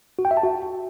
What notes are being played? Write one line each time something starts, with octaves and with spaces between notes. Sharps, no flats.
F#4
G5
E5
A5
F#4